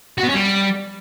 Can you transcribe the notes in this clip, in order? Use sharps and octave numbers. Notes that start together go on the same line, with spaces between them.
F#4
B3
C#4
G3